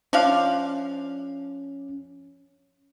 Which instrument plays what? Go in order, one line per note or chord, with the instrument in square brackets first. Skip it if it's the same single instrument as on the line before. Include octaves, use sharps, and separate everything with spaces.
[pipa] F3 D4 F5 [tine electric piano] C#4